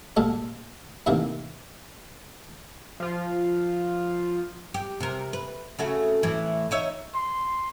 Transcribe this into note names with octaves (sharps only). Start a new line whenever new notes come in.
D2 G2 A#2 G#3 A4
A2 C3 D#3 E3 A#3
F3 F4
G4
C3 A#4
B4
C#3 A3 F#4
A2 E3
D#4 C#5 E5
C6